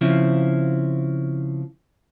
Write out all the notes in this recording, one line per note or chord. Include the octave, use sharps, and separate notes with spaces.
C#3 F3 C4 E4